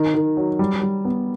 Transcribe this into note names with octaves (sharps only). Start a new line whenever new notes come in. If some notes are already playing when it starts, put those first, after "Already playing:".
Already playing: D#3
D#3
F#3
G3
G3
B3